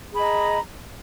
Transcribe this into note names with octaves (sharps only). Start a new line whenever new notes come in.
G#4 D#5 A#5 B5